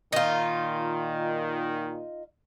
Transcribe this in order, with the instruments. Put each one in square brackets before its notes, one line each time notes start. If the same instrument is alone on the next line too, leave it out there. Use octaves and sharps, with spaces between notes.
[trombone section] A#2 D#3 [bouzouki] D#4 F4